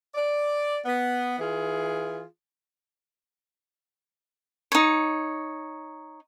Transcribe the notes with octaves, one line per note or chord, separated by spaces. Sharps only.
D5
B3
E3 F4 G#4
D#4 C#5